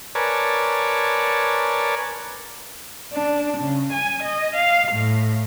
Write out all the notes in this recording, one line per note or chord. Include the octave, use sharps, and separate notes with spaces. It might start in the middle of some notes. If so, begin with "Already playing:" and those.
A#4 B4 C#5 D5 G#5 A5
D4
C#3
G#5
D#5
F5
A2